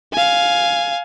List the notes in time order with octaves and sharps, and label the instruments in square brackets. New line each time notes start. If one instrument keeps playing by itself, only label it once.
[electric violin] F5 G#5